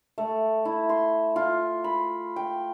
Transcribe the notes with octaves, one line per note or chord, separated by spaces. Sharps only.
A3
E4
C6
F4
B5
G5